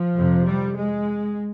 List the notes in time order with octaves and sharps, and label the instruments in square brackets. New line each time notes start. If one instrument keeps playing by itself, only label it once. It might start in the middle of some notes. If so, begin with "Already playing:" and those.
Already playing: [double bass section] F3
F2 C3
G3
G#3